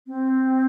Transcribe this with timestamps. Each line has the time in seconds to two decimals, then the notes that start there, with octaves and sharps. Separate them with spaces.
0.07 C4